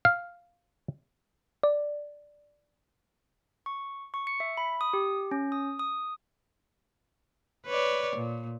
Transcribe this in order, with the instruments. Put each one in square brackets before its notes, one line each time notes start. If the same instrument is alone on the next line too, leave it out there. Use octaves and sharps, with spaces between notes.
[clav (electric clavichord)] F5
[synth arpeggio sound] D5
[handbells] C#6
C#6
C#7
E5
B5
D#6
G4
C#4
D#6
D#6
[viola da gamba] B4 C#5 D5
A#2